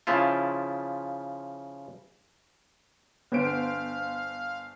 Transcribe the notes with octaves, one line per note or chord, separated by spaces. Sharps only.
C#3 F3 E4 F4
G1 B3 C5 F5 D7